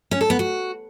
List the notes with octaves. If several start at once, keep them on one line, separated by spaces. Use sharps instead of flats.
C#4
A4
B3
F#4